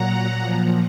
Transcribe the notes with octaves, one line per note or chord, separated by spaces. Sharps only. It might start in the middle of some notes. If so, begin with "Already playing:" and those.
Already playing: A#2 F#3 F#5 A#5
A#2 F3